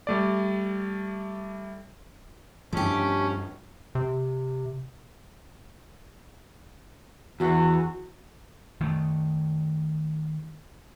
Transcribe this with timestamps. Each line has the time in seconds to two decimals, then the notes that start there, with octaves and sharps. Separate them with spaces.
0.07 G3 A3 D5
2.73 G2 F3 A3 C#4 D4 G4 A5
3.95 C3
7.40 E2 F#4
8.81 D#3 A3